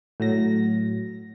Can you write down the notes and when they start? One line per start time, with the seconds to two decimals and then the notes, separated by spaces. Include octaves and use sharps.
0.20 A2 F#3 A#6